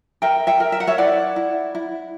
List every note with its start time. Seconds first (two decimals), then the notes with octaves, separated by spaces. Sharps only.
0.22 A#4 E5 G5
0.47 E5 G5
0.60 A#4
0.72 E5
0.80 F#5
0.87 C#5 E5
0.98 E4 D5 F#5
1.36 E4
1.75 E4